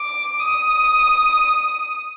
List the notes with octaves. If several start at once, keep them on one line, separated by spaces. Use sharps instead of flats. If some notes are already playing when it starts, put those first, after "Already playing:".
Already playing: D6
D#6